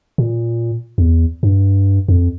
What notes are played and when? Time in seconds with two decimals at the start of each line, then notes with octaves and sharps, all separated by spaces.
0.18 A#2
0.98 E2
1.43 G2
2.08 F2